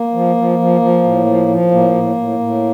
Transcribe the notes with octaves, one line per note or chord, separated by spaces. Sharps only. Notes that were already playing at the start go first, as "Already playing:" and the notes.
Already playing: A#3
F3
F3
F3
F3
A2
F3
F3
A2 A#3
A2
A2
A2